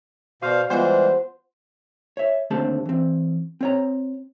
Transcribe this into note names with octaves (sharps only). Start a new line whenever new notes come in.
B2 F#4 C5 D5 F5
E3 G3 G#3 B3 F4 C5 F5 F#5
C#5 E5
D#2 D3 A3 C4 G4 A5
E3 C4
C4 C#5 A#5